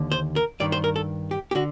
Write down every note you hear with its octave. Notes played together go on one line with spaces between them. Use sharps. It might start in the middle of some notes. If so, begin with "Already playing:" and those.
Already playing: D#2 D3
C5
A#4
G2 D#3 D5
C5
A#4
A4
G4
G4
D3 F#4